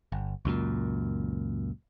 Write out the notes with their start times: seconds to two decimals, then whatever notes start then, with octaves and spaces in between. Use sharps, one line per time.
0.12 G1
0.45 C#2 F#2 A#2